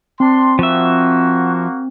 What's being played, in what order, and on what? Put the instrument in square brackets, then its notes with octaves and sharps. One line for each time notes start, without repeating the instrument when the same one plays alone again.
[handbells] C4 [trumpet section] D4 C6
[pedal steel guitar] F3 E5 [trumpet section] A#3 F#4